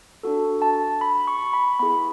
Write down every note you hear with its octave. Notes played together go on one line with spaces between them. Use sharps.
D4 F#4 A4
A5
B5
C#6
B5
B3 E4 G#4 B5